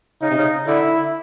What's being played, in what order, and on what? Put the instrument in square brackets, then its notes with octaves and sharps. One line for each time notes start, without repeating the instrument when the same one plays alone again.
[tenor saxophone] C#3 [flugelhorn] D#4
[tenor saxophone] C3
C#3
[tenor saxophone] D3 [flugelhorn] E4